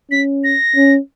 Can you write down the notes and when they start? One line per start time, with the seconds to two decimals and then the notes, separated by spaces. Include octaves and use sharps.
0.11 C#4 B6
0.44 A#6
0.76 C#4